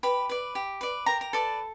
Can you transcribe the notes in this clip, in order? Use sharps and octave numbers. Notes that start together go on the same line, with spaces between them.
G4 B4 B5
B4 D5
G4
B4 D5
G4 A#4 A#5
A#5
A4 B4 D5 A5